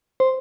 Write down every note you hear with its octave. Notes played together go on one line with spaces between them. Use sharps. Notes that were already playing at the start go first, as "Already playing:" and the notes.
C5